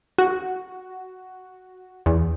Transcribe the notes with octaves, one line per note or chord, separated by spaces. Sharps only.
F#4
E2